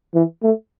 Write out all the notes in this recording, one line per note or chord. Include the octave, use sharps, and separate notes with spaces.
E3
A3